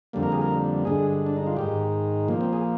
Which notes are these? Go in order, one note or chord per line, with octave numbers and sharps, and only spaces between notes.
F2 D3 G3 A#3
A#4
G#4
A#4
G2 D3 G#3 G#4
D4
D#4
F4
G#2 D#3 G#3 G4
A#2 F3 A#3
C4
G#4